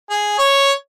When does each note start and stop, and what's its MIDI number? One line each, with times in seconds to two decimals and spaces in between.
0.10 0.35 68
0.38 0.72 73